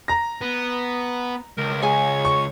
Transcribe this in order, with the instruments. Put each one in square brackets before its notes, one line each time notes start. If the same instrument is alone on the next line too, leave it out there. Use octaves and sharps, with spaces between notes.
[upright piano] A#5 A#6
[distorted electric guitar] B3
[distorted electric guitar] C#2 [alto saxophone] A#4
[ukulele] G#4 G#5 [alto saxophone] C#5
[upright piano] C#6